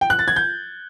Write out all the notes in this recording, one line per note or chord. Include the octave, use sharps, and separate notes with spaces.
G5
F#6
A6
G#6
G6